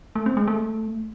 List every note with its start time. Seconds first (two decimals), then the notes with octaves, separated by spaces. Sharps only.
0.15 A3
0.26 C4
0.37 G#3
0.47 A3